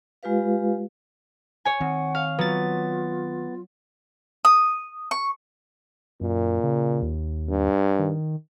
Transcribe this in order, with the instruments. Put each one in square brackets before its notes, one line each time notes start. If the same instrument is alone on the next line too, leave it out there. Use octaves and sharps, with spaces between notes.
[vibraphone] G#3 F4 G4 B4 F5
[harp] C#5 G#5
[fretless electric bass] D#3 C4 [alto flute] F#5
[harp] F5
[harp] F#3 [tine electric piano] B3 A6 [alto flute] F4
[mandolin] D#6
C#6
[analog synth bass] F#2 [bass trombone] A#2
[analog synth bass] C#3
D#2
[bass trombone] G2
[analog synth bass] D#3